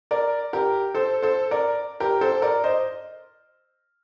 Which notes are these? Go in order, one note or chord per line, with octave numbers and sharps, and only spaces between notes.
A#4 D5
G4 A#4
A4 C5
A4 C5
A#4 D5
G4 A#4
A4 C5
A#4 D5
C5 D#5